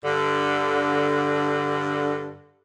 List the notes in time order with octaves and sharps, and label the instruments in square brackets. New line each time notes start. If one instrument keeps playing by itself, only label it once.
[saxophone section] G2 D3